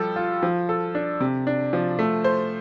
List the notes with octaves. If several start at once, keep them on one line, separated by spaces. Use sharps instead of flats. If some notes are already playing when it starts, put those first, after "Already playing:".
Already playing: F3 G3 A4
F4
F3
A4
D4
C3
D4
F3
A3
C5